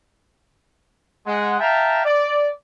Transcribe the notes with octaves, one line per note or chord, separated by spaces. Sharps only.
G#3 F#5
E5 F5 G5 A5 A#5
D5